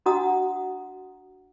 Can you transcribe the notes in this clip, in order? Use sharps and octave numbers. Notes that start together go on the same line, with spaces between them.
D4 F#4 D#5 F#5 A#5 D#6